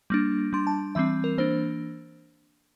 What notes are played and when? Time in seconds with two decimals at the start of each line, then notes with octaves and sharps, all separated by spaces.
0.10 G3 A#3 D4
0.53 G3 D4 C6
0.67 A5
0.95 E3 G3 C4 E5
1.24 A#4
1.38 E3 A#3 D4 C5